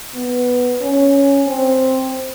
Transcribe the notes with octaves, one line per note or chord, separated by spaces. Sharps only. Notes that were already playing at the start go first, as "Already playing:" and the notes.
B3
C#4
C4